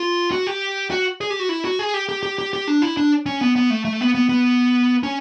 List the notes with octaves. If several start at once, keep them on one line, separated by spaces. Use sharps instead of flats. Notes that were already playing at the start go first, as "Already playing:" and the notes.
Already playing: F4
F#4
G4
F#4
G#4
G4
F#4
E4
F#4
G#4
G4
G4
G4
G4
G4
D4
E4
D4
C#4
B3
B3
A3
A3
B3
B3
B3
C#4